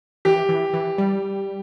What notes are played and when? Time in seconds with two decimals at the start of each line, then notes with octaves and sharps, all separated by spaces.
0.25 E3 G4
0.49 E3
0.74 E3
0.98 G3